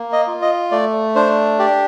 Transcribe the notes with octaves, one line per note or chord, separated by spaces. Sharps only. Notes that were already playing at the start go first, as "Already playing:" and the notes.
Already playing: A#3
D#5
F4
D#5
A3 D5
D4 C5
G4 D5